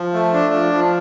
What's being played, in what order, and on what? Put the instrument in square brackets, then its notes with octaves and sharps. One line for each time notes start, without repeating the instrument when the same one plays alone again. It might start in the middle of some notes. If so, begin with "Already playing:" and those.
Already playing: [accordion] F3
A3
D4
F3
F3